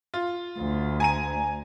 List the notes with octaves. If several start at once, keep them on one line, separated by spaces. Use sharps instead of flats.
F4
D2
G#5 A#5 D#7